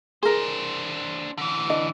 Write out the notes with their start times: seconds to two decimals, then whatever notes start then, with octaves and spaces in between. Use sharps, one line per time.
0.23 D4 G#4 A#4 C5
1.38 D3 E3
1.70 D4 D#5